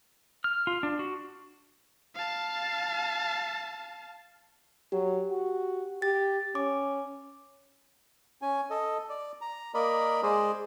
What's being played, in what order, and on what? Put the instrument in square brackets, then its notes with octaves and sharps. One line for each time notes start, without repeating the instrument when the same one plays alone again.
[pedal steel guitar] F6
F4
D4
F#4
[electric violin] F5 A5
[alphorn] F#3 [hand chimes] G4
[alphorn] F#4
[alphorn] G4 [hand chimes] A6
[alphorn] C#4 [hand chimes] D6
[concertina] C#4 G#5
A4 D#5
D5
A#5
A#3 A#4 D5 D#5 B5
G#3 G#4 C5 D5 D#5